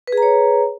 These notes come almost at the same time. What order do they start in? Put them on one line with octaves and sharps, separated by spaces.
B4 G#4 A#5 C#5